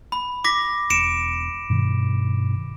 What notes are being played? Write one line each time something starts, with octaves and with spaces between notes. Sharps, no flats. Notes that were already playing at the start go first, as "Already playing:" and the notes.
B5
D6 A#6 B6
E1 C#7 D7 E7
G2 B2 D#3